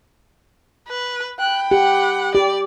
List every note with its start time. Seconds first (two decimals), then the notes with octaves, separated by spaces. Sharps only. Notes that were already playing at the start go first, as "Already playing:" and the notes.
0.88 B4
1.39 G5 B5 F#6
1.71 G4 F#5
2.35 G4 D5